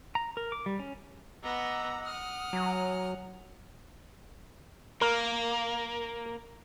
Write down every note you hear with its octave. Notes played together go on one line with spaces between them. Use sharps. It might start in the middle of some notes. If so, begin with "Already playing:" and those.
A#5
A#4
D6
G3
C#4
B3 D#5 F#5 A#5 D6 E6
F#5 D#6 F6
F#3 G#5 A#5
A#3 A#4